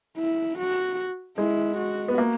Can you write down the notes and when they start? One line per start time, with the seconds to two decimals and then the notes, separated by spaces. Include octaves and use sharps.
0.17 E4
0.58 F#4
1.38 G#3 E4
1.78 F#4
2.08 B3
2.18 A#3